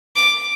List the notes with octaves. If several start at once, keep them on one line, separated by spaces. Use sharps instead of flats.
D6